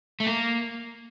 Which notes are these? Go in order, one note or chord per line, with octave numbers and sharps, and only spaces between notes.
A3
A#3